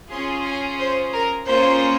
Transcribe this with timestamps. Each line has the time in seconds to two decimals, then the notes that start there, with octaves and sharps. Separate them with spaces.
0.11 C#4 F4 G#4 C6
0.45 G#5
0.79 C5
1.14 A#4
1.48 A#3 C#4 F4 G#4 C5